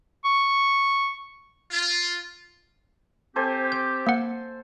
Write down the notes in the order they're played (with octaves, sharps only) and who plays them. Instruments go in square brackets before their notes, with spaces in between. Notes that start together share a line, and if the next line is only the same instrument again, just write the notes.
[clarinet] C#6
[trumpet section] F4
[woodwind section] C4 G4 [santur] A4 C5 G#5
[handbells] G6
A#3 F#5